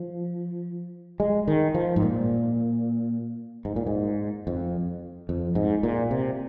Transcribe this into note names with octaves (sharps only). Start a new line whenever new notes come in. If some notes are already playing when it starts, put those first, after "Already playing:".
Already playing: F3
G#3
D#3
F3
G#2
A#2
G#2
A#2
G#2
F2
F2
G#2
A#2
C3